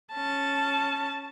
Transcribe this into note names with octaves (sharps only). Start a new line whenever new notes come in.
C#4 A5